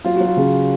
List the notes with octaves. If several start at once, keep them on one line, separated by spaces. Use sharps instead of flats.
F#3 F4
F#3 F#4
F4
C#3